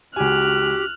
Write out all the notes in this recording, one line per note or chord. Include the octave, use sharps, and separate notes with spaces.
C#2 F#4 G4 G#5 F6 F#6